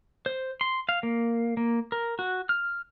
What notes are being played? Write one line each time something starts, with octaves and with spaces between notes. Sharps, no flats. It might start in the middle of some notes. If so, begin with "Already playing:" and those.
C5
C6
F5
A#3
A#3
A#4
F#4
F6